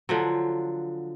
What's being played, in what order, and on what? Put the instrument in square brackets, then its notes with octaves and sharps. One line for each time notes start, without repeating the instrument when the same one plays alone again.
[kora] D3 F3 F#3